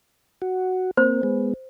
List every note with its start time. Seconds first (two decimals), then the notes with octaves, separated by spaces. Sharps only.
0.42 F#4
0.97 A#3 C4 C5
1.23 G#3 B3